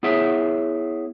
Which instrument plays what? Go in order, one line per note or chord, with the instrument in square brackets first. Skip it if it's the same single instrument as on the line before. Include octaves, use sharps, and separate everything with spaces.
[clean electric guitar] B3 E4 G#4 C#5 E5